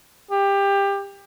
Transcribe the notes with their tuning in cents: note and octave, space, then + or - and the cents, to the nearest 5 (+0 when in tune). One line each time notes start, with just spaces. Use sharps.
G4 +20